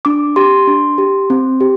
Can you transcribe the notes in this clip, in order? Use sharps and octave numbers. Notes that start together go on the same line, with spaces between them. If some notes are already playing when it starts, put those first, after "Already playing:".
D4 D6
G4 C6
D4
G4
C4
G4